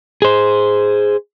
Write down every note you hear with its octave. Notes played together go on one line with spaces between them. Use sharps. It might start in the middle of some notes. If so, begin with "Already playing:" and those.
G#4 C5